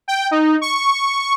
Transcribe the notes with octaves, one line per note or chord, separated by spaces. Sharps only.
G5
D#4
C#6